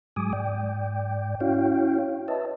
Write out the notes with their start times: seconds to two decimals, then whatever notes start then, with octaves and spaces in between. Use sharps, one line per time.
0.16 G#2 F#3 G#3 G#5 D6 D#6
0.33 G#2 D5 G5
1.40 C#4 E4 F#4 C#5 F5 G5
2.28 B4 C#5 D#5 E5 A5